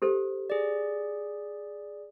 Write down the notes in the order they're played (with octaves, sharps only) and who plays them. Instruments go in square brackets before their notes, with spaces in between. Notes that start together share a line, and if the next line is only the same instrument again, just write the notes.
[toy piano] G4 A4 C5
[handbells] G#4 D5